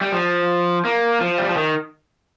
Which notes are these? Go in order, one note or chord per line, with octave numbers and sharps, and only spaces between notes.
G3
F3
A#3
F3
G3
F3
D#3